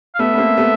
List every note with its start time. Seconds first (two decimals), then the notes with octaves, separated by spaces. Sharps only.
0.15 F5
0.19 A3 B3 E5
0.34 B3
0.38 A#3 C4
0.57 A3 B3